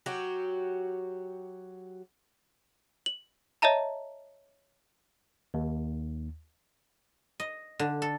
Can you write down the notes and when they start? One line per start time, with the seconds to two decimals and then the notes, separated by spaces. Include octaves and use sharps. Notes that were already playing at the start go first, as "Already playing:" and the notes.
0.06 F#3 F#4 G4
3.06 F#7
3.62 C#5 D#5 E5 A5 A#5
5.54 D#2
7.40 D#5
7.79 D3
8.02 A4